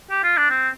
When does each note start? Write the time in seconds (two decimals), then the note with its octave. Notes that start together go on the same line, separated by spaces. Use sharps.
0.10 G4
0.24 F4
0.37 D4
0.50 C4